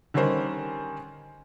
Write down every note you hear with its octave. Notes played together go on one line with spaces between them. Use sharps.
D3 D#3 G3 C#4 A#4 C5